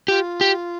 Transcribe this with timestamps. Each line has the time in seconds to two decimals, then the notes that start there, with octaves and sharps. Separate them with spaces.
0.08 F4 G4
0.41 G4